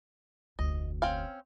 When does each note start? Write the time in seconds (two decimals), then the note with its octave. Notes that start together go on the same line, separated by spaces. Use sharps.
0.59 F1 D2 D#5
1.02 C4 C#4 F5